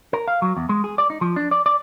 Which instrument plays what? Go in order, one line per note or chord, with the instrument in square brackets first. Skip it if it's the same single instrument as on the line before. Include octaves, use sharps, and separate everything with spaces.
[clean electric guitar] A#4
F5
F#3
E2
G#3
G#4
D5
D#4
F3
D4
D5
D5